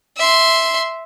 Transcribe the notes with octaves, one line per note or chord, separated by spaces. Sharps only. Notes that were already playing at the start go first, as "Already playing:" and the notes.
E5 C6